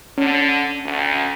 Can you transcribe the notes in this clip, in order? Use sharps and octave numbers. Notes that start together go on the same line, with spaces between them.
D3 C#4
D2